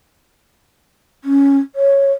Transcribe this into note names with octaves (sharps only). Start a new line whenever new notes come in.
C#4
C#5